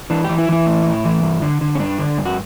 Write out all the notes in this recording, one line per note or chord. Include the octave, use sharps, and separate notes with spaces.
E3 D4
E3 G4
E4
E3 E4
A2
A2
E3
G2
D3
D3
C#4
G2 D4
D3
G2
F#4